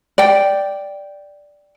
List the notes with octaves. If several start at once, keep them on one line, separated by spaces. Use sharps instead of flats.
D5 G5